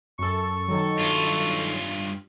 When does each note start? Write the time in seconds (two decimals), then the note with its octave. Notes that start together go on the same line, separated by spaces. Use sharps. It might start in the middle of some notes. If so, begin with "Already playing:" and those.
0.19 F#2 A4 C#6
0.68 D#3 F#3 A4
0.99 G2 F4